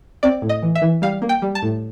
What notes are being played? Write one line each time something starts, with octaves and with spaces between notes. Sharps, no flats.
C4 D5
A2
D#5
E3
E5
E3
G3 F5
A#3
G5
G3
A5
A2